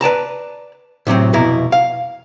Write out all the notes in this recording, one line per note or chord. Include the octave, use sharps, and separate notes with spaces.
B4 D5 A5 A#5
A2 C3 F#3 C4
C2 F2 B2 E4 A#5
F5